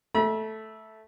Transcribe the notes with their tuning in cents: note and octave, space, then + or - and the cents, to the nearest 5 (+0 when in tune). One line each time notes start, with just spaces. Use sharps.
A3 -5 B5 -45